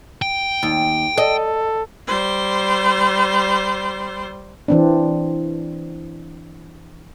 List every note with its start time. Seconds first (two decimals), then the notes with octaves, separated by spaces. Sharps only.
0.22 G5
0.63 D#2
1.18 A4 D#5
2.07 G3 C5
4.68 E3 C4 D4